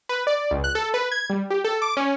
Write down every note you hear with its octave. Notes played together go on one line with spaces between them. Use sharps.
B4
D5
C#2
F#6
A4
B4
G#6
G3
G4
A4
D6
C#4